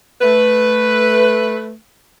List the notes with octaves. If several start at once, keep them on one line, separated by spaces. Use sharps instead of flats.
A3 B4